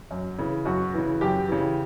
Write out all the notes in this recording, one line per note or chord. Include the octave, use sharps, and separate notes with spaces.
F#2
C#3 E3
F#2 F#4
C#3 E3
F#2 G4
C#3 E3